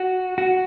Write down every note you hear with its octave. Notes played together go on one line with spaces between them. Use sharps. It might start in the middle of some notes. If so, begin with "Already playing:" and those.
Already playing: F#4
F#4